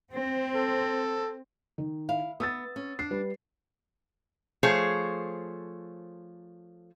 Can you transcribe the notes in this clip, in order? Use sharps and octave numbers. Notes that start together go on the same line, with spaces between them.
C4
A4
D#3
E4 F5
B3 D#6 E6 A6
C#4
D4 C7
G3 B4
F3 A3 G#4 C5 C#5